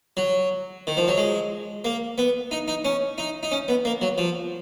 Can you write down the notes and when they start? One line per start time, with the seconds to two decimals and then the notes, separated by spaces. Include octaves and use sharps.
0.17 F#3
0.87 D#3
0.97 F3
1.08 F#3
1.17 G#3
1.85 A#3
2.18 B3
2.51 D#4
2.68 D#4
2.85 C#4
3.18 D#4
3.43 D#4
3.51 C#4
3.68 B3
3.85 A#3
4.01 F#3
4.18 F3